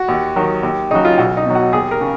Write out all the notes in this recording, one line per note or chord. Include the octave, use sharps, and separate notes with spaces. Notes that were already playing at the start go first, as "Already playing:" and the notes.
Already playing: F#4
D#2
D#3 F#3
D#2
C#3 F#3 D#4
F4
B1 F#4
D#4
B2 F#3
F#4
D#2 G#4
A#4
C#3